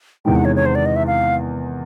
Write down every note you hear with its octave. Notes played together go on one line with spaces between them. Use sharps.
E2 C3 D#3 G#3 G5
F#5
C#5
C#5
C5
D5
D#5
E5
F5